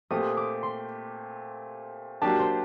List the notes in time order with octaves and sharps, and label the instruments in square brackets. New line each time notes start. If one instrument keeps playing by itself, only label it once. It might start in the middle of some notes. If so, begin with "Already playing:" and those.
[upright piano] A#2 A3 C4 G4 [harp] D#6
[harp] D6
C6
[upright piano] F#3 A#3 D4 G4 [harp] A5
[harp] C5